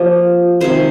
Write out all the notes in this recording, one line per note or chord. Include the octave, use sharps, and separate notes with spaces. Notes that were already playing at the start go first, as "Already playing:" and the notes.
Already playing: F3 A#3 F4 G4
C3 D#3 G#3 C5